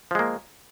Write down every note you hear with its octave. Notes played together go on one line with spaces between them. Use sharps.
F3 G#3 A#3